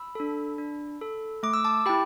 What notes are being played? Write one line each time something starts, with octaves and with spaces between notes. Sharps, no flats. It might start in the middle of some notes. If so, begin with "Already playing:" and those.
Already playing: B5 E6
D4 A4
D4
A4
A3 D6
E6
A5 D6
E4 G4 G5 B5